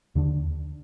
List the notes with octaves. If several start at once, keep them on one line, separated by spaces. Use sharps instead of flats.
D#2 D3 G3 D4